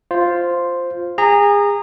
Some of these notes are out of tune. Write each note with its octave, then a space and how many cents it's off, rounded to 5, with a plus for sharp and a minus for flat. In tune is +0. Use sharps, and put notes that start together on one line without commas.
F4 +0 C5 +0
G#4 -30 A#5 -15